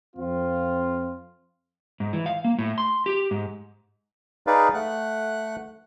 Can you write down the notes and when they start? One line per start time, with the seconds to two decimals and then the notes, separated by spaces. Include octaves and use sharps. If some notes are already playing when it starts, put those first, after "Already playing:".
0.16 F2 C4 F4
2.00 G#2
2.13 E3
2.26 F5
2.45 A#3
2.59 A2
2.78 C6
3.06 G4
3.31 G#2
4.47 D#4 G#4 B4 D5 F5
4.74 A3 F#5 F#6